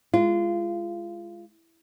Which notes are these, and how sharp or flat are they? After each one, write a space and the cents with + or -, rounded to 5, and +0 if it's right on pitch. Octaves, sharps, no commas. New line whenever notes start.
G#3 +0 F4 -25